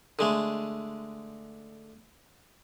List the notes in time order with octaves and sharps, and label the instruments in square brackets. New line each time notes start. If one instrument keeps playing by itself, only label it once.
[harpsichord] D3 G#3 A3